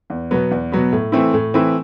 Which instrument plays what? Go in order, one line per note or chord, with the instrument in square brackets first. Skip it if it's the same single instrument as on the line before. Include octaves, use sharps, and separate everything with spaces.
[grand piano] E2
B2 F#3 B3
E2
B2 F#3 B3
A2
E3 A3 C4 E4
A2
E3 A3 C4 E4